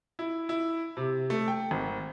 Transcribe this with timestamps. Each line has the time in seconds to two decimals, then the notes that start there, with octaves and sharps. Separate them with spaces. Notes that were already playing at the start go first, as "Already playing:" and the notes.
0.19 E4
0.49 E4
0.97 C3
1.30 A3
1.48 G5
1.71 G#1